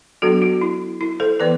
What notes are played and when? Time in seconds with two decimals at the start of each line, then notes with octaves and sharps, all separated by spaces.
0.22 F#3 B3 D4 F#4 A4
0.42 F#4
0.61 E4
1.01 E4
1.20 A4 C5
1.40 E3 B3 B4 D5